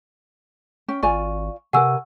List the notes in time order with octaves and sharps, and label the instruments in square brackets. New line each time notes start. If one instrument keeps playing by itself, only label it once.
[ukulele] C#4 G5
[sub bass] G#1 [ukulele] F4 D5 G#5 [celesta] C#6
[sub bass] C3 [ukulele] A#4 B4 G#5 [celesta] F#5 C#6 E6